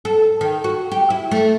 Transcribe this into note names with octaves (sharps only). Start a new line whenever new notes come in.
A4
D#3
F#4
G4
E4
A3